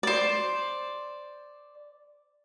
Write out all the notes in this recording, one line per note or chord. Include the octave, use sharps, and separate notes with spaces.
C5 D5